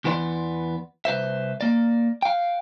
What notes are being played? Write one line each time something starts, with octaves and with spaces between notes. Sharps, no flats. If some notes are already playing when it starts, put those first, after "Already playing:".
E2 E3 B3 C5 D5 C6
C2 B4 C5 E5
A#3 D5
F5 G5